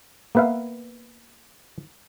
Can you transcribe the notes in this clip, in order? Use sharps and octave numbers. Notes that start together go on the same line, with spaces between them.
A#3 B3 B4 E5 F5